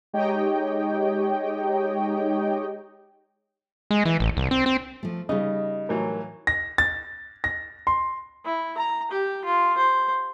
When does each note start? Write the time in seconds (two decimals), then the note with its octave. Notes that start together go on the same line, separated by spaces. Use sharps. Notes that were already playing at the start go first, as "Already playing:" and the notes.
0.13 G#3 D#4 G4 C#5 D#5 G5
3.91 G#3
4.05 E3
4.20 A1
4.37 C2
4.51 C4
4.66 C4
5.03 F3 A3
5.29 C#3 G3 D#4 D#5
5.89 A2 E3 F#3 A#4
6.47 A#6
6.78 A6
7.44 A#6
7.87 C6
8.46 E4
8.78 A#5
9.12 G4
9.45 F4
9.78 C5